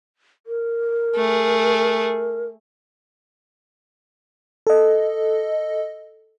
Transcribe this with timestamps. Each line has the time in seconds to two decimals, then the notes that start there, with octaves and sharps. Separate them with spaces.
0.46 A#4
1.15 A3 G#4
4.67 A4 D#5